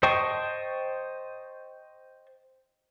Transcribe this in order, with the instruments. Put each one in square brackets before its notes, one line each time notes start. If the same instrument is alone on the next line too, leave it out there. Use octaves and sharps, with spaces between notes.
[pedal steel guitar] C5 D#5 G5 A5 C#6